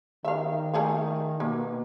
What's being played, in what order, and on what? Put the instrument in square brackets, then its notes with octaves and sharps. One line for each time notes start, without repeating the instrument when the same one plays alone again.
[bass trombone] D#3 [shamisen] E5 F5
[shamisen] A3 G#4 F5
[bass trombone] B2 [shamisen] A#3